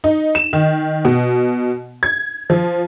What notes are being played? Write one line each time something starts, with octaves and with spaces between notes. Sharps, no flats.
D#4
E7
D#3
B2
G#6
F3